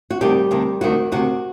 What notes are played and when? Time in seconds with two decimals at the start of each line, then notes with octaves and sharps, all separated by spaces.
0.10 F#4
0.21 D2 C3 D#3 G3 G4
0.51 D2 C3 D#3
0.81 D2 C3 D#3 F#4
1.12 D2 C3 D#3 F#4